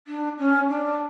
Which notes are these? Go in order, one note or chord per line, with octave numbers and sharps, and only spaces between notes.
D4
C#4
D4